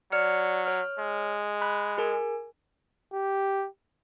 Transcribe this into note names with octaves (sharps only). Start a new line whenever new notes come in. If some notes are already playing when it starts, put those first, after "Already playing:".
F#3 D5 F6 C#7
C#5 F6
G#3
B5 F#6
G#4 A#4 G#5
G4